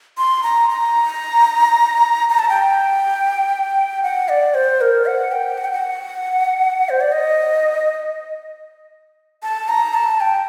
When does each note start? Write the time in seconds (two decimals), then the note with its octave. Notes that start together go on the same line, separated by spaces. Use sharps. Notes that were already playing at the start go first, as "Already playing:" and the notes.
0.18 C6
0.43 A#5
0.70 A#5
2.29 A#5
2.39 A5
2.49 G5
4.03 F#5
4.29 D5
4.54 C5
4.81 A#4
5.06 F#5
5.32 G5
5.58 F#5
5.65 G5
5.72 F#5
6.89 C5
7.01 D5
7.12 D#5
9.43 A5
9.69 A#5
9.94 A5
10.21 G5